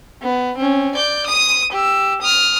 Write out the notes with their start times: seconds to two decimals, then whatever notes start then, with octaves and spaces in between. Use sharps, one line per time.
0.22 B3
0.57 C4 C#4
0.95 D5 G6
1.26 D#6 D#7
1.72 G4 E6
2.21 D#6 F6